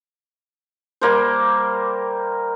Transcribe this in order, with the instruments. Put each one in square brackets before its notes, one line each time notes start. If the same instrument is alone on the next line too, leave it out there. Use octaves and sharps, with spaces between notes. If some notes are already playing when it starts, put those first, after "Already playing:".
[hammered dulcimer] G3 A#3 C5